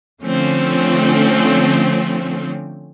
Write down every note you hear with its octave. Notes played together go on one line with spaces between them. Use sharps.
D3 F3 A3 C4 C#4